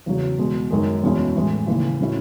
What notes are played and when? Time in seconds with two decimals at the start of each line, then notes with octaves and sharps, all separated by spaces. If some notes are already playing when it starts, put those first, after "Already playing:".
0.06 E2 C#3 F#3
0.38 E2 B2 G#3
0.71 F#2 D#3 G#3
1.03 E2 B2 G#3 C#4 E4
1.36 A2 E3 G#3
1.67 D#2 C#3 E3
2.00 A2 F#3 C#4 E4